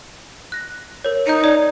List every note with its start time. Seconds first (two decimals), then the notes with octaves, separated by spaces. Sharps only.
0.52 F#6 A#6
1.05 A#4 C#5
1.27 D#4 G6 C#7
1.44 D5